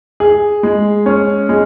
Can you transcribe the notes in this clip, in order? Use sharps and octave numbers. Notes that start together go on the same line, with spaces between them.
G#4
G#3
C#4
G#3